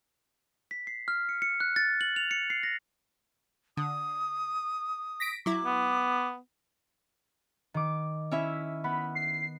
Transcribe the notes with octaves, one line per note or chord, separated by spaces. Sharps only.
B6
C7
F6
C#7
C#7
F#6
A6
F#7
F7
C#7
C7
A#6
D3 D#6
A#6 B6 D7
F#3 E4 D6
B3
D#3 D6
C#4 E4 E5
B3 B5
C7